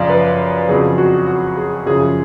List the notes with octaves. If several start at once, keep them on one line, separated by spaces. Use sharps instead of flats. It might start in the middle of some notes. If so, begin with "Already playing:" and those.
Already playing: F#2 C#3 F3 D5 F5
B4
F2 C#3 F#3 G#4
F#4
F#4
G#4
F#2 C#3 F3 G#4